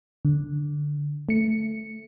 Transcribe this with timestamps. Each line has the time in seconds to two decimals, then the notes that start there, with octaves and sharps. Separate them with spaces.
0.25 D3
1.29 A3 C#7